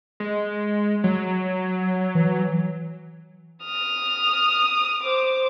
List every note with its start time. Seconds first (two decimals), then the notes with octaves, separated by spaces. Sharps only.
0.20 G#3
1.04 F#3
2.15 E3
3.64 D#6 F6
5.03 C5 D6